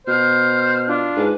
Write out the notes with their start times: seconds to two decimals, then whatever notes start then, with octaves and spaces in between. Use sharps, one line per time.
0.07 B2 C5 F6
0.88 D4 F4
1.17 G#2 B4